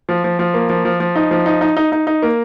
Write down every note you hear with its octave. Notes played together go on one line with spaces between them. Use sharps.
F3
F3
F3
A#3
F3
F3
F3
D#4
F3
D#4
D#4
D#4
D#4
D#4
A#3